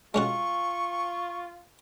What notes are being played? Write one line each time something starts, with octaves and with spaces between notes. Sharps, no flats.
G#3 C#4 F4 F#4 C#6